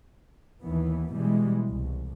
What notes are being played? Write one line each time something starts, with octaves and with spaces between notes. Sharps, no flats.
D#2 E3 B3
B2 E3 G3 G#3
C2